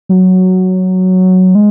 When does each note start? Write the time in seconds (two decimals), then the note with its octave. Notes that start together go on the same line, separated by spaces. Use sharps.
0.09 F#3
1.55 G#3